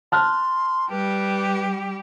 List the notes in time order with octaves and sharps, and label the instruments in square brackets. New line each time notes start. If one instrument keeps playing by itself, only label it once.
[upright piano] A5 F6 F#6 [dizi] C6
[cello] G3 G4 [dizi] B4